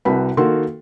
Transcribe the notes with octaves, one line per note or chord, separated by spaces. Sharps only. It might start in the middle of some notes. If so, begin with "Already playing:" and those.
C2 C3 F#4 B4 B5
D#3 A#3 F#4 A4 C6